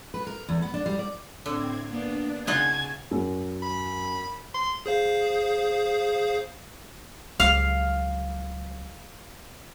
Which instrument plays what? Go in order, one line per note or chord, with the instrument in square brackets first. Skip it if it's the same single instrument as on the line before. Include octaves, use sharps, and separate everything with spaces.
[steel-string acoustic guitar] B4
A#4
E2
B3
D4
G3
D5
[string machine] A2 C4 G#6 [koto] D3
[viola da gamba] A#3 B3 [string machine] D4
[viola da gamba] C#3 [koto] D#4 F4 F#5 [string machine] G#5 A5 [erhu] G#6
[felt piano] F#2
[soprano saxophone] B5
C6
[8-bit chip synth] G#4 C5 F5
[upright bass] C#2 F#3 [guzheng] F5